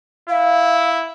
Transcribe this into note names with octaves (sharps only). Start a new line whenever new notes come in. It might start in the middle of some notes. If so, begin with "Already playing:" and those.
E4 F5